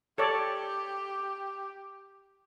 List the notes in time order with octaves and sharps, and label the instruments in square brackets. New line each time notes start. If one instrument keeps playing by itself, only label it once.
[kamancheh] G4 [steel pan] A4 C#5 D5